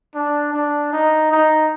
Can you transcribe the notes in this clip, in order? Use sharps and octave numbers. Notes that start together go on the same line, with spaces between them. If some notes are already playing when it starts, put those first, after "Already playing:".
D4
D4
D#4
D#4